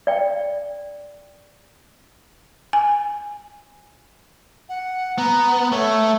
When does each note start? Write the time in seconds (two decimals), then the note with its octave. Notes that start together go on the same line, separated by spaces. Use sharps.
0.07 D5 G5
2.73 G#5
4.69 F#5
5.18 B3 A#5
5.72 A3 C#5